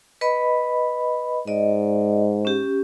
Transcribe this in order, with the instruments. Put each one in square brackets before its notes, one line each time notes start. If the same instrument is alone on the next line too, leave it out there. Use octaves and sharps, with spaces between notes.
[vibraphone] B4 D#5 B5
[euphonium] G#2 [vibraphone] D5 D#5
[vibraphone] C#4 G4